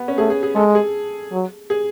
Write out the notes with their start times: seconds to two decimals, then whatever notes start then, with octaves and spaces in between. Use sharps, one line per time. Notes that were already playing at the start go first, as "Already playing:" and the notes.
Already playing: B3
0.08 C#4
0.18 A3 G#4
0.30 G#4
0.43 G#4
0.55 G#3 A4
0.75 G#4
1.32 F#3
1.70 G#4